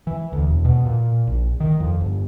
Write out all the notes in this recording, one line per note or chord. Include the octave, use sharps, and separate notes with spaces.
E3
D2
E1
B2
A#2
A#1
D#3
F2
G1